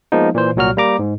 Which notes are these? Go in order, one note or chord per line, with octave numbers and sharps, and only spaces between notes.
F3 G#3 A#3 B3 D#4
A#2 E3 C5
C2 A#2 F#3 F#4 F6
G3 A#3 A#5 D6
G#2